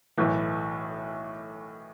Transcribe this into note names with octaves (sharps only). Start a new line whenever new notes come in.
B1 A2 E3